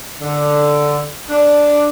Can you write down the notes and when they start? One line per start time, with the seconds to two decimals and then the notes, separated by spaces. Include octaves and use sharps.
0.20 D3
1.29 D4